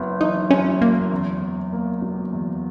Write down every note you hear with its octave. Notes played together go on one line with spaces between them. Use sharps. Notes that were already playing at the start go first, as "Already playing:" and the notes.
Already playing: F#1 F#2 B3
E3 D#4
F#2 C#4
F#1 A#3
E2
F#1
A#3
B2
E2